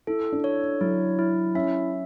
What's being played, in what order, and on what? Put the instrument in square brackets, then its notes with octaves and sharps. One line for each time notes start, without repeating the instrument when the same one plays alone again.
[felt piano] E4 [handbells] A4
[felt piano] D4
[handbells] C#5
[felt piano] F#3 [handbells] E4
[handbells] E4
[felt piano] C#4 [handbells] E5